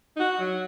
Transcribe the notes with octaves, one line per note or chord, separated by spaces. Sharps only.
D#4
F#4
F#3